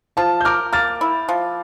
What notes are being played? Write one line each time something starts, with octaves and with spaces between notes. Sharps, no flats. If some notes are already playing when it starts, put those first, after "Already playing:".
F3 A5
G6
A#4 D6 F6
A#3 F6 A6
E4
F3